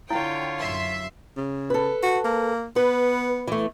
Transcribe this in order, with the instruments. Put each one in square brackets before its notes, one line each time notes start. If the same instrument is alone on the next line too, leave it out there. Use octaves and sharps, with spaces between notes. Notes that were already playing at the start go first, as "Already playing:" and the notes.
[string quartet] D3 F4 C#5 [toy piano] E4 [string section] G5
[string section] F#2 E5 C6
[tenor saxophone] C#3
[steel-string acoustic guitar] A4 B4
[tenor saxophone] F#4
A#3
[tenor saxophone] B3 [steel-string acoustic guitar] B4
[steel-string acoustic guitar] E3 A3